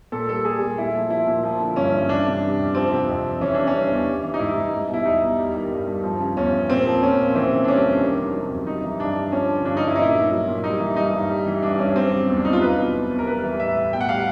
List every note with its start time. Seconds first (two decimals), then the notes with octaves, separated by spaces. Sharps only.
0.12 A#2 A4
0.29 G3 A4
0.45 G3 G#4
0.62 A#2
0.78 A#2 E4
0.95 F3
1.10 F3 E4
1.27 A#2
1.43 F3
1.60 D3
1.76 G2 C#4
1.94 G2
2.09 E3 D4
2.26 C3
2.42 G3
2.59 F2
2.75 F3 C4
2.91 C3
3.08 F2
3.24 F2
3.41 E3 C#4
3.54 C#3 D4
3.67 C#4
3.73 G3
3.91 E2
4.07 G3
4.23 E3
4.34 D#4
4.39 G#2 E4
4.56 G#2
4.72 G3
4.88 B2
4.94 E4
5.05 E2 D#4
5.22 E2
5.38 G3
5.55 D#3
5.71 G2
5.88 G2
6.04 F3
6.20 C#3
6.37 E2 C#4
6.53 E2
6.69 A#2 C4
6.87 F3
7.03 F3 C#4
7.19 A#2
7.35 E3 C4
7.52 C#3
7.64 D4
7.68 G3 C#4
7.85 F2
8.01 D#3
8.17 C3
8.34 F#3
8.50 F2
8.67 G3 D#4
8.83 E3
8.99 G2 D4
9.16 G2
9.32 F3 C#4
9.49 D3
9.65 G2 D4
9.77 D#4
9.82 G2
9.87 E4
9.96 D#4
9.99 A#2 E4
10.14 F#3
10.32 F#3
10.47 A#2
10.64 G3 D#4
10.80 E3
10.96 G2 D#4
11.13 G2
11.30 G3
11.46 E3
11.62 G2 D4
11.78 G2 C#4
11.95 F#3 C4
12.12 C#3
12.28 E2
12.37 D4
12.45 E2 D#4
12.53 F4
12.61 F#3 B4
12.77 B2
12.94 E2
13.10 E2
13.19 A#4
13.27 G3 B4
13.43 E3
13.60 A2 E5
13.77 A2
13.92 B2 G5
14.01 F#5
14.09 G3 F5
14.16 F#5